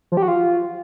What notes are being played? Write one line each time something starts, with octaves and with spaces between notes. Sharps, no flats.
F3
G4
F#4
F4